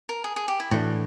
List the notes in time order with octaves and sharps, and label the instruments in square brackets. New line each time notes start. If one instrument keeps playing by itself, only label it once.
[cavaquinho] A#4
G#4
G#4
G4
E4
[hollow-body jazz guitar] A2 E3 A3 D4 [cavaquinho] F#4